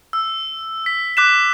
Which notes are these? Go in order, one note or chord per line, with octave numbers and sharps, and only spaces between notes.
E6
B6
D6 F#6 B6 E7